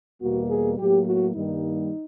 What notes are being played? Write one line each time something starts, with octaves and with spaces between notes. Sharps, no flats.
E2 B2 G3 A#3 F#4
G#4
A2 F#3 A#3 G4
F#4
G2 D#3 G3 A#3 D#4